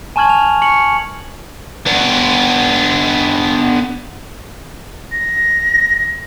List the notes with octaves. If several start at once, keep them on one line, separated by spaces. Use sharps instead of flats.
G#5 A5 C#6 F6 G#6 F#7
F7
C#6 C#7 F#7
B3 D4
A#6